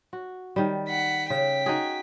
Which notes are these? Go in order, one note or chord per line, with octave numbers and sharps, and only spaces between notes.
F#4
D#3 G3
F#5 B6
C#3 G5 B6
D#4 F#4 G#4